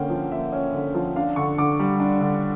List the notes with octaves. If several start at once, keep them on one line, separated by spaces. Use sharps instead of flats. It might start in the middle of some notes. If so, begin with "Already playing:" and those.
Already playing: D3 A#3 C#4 G5
F3
A#3 E5
C#4
D3
F3
D4 F5
D3 C#6
D3 D6
G3
D4
D3